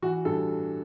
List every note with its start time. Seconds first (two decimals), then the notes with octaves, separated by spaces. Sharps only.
0.02 E3 F#4
0.25 G2 A4